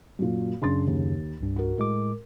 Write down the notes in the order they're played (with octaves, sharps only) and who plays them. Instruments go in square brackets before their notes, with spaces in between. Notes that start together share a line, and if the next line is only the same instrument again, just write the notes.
[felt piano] F#2 A#2
[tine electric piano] F#2 C#3 [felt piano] D4 C6 A6
[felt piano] D#2
[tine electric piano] C2 G2
[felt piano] F#4 A#4
[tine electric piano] A2 G#3 D6 [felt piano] A#4